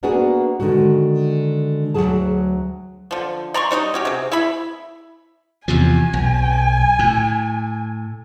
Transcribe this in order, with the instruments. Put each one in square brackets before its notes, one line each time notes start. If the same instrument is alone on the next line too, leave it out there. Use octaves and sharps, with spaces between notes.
[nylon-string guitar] A#3 B3 D4 F#4 G#4
D3 D#3 G#3 F#4
D2 A#2 F#3 G#4 A5
[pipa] D3 F3
D5 A#5 C6 C#6
G3 D#4 C#5 D#5
C#4 F#4 G4
C3 G#4
E4 E5 B5
[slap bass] E2 C3 F3 [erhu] G#5
[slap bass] B1
A2